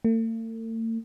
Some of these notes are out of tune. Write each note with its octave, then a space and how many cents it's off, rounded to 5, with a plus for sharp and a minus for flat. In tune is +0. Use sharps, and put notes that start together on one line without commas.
A3 +45